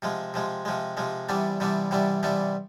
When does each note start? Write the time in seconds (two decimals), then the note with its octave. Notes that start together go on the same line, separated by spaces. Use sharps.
0.02 C3 F3 G#3
0.34 C3 F3 G#3
0.65 C3 F3 G#3
0.97 C3 F3 G#3
1.29 C3 E3 G3 B3 D4
1.60 C3 E3 G3 B3 D4
1.91 C3 E3 G3 B3 D4
2.23 C3 E3 G3 B3 D4